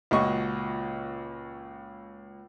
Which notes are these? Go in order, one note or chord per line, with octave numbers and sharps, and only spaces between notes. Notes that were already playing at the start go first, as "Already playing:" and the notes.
C#2 A#2 F#4 D#5 C#6